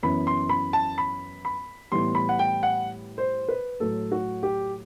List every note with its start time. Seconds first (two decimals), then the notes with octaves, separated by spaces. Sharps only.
0.03 F#2 E3 B3 B5
0.27 C6
0.49 B5
0.73 A5
0.98 B5
1.45 B5
1.92 A2 E3 G3 B3 E4 C6
2.15 B5
2.29 F#5
2.39 G5
2.63 F#5
3.18 C5
3.49 B4
3.80 A2 F#3 A3 A4
4.12 F#4
4.43 G4